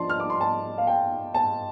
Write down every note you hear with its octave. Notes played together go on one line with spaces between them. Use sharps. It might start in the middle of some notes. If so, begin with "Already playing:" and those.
Already playing: F3 D4 A5 C6
F6
D6
C6
A5
F5
G5
A5